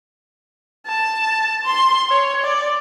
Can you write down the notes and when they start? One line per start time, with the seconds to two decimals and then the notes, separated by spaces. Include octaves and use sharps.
0.86 A5
1.65 C6
2.11 C#5
2.42 D5